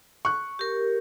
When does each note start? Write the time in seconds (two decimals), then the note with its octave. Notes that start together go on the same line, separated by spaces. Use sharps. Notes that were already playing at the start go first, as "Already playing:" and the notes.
0.25 C#6 F#6
0.59 G4 A#4